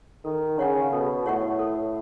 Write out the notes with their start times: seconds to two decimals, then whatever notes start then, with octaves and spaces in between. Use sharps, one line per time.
0.25 D#3 A4
0.59 C#3 C#5 F#5 C#6
0.92 B2 A4
1.26 A2 C#5 F#5 C#6
1.59 A4